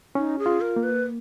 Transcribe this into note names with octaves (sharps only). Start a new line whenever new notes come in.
C#4 D#4
G#4
F4
A#4
A#3
B4